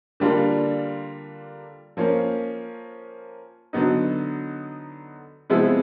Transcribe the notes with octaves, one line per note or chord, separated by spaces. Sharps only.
D3 G3 A#3 D4 F4
F3 A#3 C#4
D3 F#3 B3 D#4
C3 F3 G#3 B3 E4